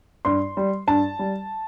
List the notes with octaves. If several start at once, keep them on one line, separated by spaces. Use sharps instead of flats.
G2 C6
G3
G2 A5
G3